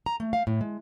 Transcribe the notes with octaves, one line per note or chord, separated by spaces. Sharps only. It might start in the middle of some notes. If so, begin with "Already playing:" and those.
A#5
A3
F5
A2
G#3